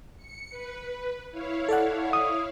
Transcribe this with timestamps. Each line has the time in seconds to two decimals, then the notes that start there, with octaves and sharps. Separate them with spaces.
0.17 C#7
0.50 B4
1.32 E4 C#5 F5
1.68 A4 D5 F#5
2.13 D#6